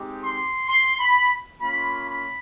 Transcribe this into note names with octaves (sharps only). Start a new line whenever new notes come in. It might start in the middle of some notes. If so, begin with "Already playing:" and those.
Already playing: G#3 C4 D#4 G4
C6
C6
B5
A#3 C#4 F4 B5
B5